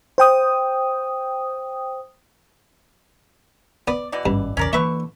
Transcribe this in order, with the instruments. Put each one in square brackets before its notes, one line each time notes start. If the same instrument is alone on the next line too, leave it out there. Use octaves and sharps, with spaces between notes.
[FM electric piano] C5 G5 D#6
[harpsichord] B3 [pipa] D5
[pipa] B2 E3 D5
[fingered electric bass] G#1 C#4 [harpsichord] G2
[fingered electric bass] A#1 E2 C#3 [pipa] C#4 A#4 D5
[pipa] D3 B4 C#6 [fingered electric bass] E3 A#3 [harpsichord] E5